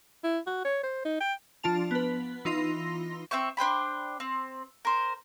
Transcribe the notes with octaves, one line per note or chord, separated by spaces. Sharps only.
E4
F#4
C#5
C5
D#4
G5
F3 D4 F4 A5 F7
B3 B4
E3 D#4 F4 C6 A#6
C4 E5 G5 C#6
D4 C5 G5 B5
C4
A#4 C5